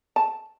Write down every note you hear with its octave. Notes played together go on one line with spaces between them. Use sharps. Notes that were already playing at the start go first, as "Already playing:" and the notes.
A5